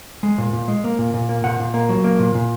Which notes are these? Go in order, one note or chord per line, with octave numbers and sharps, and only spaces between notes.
G#3
A#2
A#2
G#3
A#3
A#2
A#2
A#3
A#2 F#5
A#2
A#3
F#3
A#3
A#2
A#2